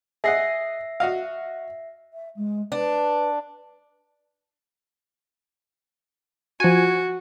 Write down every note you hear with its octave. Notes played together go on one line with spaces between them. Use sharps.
G#4 D#5 E5 F#5 A#6 C7
F#4 D#5 F5
E5
G#3
D4 B4
F3 F#4 G#5